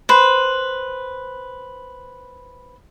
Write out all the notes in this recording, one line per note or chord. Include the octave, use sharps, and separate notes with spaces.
B4 C5